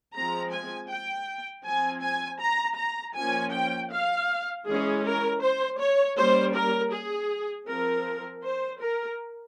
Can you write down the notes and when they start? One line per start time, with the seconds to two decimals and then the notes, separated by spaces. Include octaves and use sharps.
0.15 F3 G#3 C4 A#5
0.52 G#5
0.90 G5
1.65 F3 C4 G#5
2.03 G#5
2.41 A#5
2.78 A#5
3.16 F3 A#3 C#4 G#5
3.54 G5
3.91 F5
4.67 E3 G#3 C#4 G#4
5.04 A#4
5.42 C5
5.80 C#5
6.17 G3 A#3 C#4 C5
6.55 A#4
6.93 G#4
7.68 F3 C4 A#4
8.44 C5
8.81 A#4